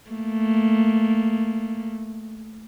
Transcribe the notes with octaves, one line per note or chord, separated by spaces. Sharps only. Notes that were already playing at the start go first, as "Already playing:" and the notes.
A3 A#3